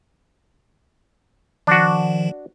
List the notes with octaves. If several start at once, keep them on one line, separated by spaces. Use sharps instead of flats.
D#3 F3 D4 F#4